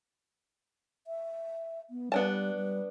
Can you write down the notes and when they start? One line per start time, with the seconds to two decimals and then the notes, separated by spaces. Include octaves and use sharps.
1.07 E5
1.90 B3
2.12 G3 B3 D4 A5
2.56 G3